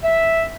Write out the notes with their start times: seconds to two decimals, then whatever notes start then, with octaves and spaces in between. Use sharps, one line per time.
0.04 E5